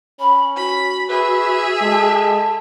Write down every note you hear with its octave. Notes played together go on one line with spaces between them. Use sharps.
C#4 B5
F#4 B5
G#4 B4 E5
G#3 A4